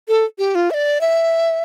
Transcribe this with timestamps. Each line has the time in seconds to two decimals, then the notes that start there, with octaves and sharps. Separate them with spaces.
0.08 A4
0.39 G4
0.55 F4
0.71 E5
0.74 D5
1.01 E5